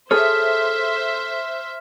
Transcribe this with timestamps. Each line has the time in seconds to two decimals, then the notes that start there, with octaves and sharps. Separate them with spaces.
0.11 G#4 A4 C5 C#5 E5 F6